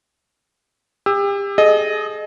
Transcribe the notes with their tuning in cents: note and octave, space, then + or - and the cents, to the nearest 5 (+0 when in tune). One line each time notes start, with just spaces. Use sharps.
G4 +35 E6 +0
G#4 +40 D#5 -10